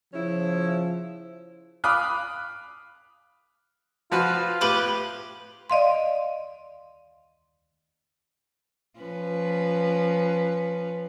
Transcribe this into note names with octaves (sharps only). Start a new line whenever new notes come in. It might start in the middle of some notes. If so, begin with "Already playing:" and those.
C#3 F3 C#4 E4
F5 B5 D6 D#6 F6 F#6
F3 F4 F#4 B4
A2 G4 B4
D5 D#5 F5 C6
F3 C#4 B4